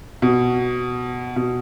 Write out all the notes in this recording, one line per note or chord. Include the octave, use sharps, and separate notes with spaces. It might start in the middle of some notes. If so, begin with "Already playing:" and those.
B2
B2